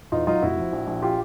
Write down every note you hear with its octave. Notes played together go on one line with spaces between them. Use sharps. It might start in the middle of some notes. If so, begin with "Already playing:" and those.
E2 D#4 F4
F#3 D#4 F4
F1 E4 F#4
F3
A#1
A#1
F4 G4